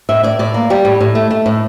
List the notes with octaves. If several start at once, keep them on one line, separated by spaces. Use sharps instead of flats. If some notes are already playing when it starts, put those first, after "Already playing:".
A2 E5
A2 D5
A2 D5
A#3
G3 G4
A2
A2
A3
A3
A2